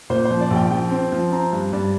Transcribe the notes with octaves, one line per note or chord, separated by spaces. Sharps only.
A#2 C5
C5
F3
D5
A#1
G5
F3 G5
C4
F3
C4 A#5
G2
G2 D5